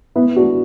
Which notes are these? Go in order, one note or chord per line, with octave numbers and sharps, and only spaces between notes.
B3 E4
D4 F#4